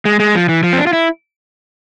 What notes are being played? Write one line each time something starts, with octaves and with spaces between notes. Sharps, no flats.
G#3
G#3
F3
E3
F3
C4
D4
F4
E4